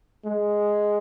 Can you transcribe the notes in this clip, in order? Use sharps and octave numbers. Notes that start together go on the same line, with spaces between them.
G#3